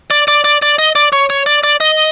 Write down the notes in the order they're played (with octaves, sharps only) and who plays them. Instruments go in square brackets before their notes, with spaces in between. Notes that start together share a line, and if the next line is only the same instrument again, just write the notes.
[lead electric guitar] D5
D5
D5
D5
D#5
D5
C#5
C#5
D5
D5
D#5